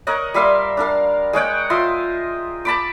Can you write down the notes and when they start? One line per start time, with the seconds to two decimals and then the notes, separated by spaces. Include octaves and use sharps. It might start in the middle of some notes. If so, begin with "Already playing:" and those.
0.07 A#4 C#5 D#5 F#5
0.34 G3 E5 F5 C6
0.77 D4 A#4 F5
1.33 G#3 C#5 F#5 G5
1.70 F4 D#5 E5 C6
2.65 A5 B5 D6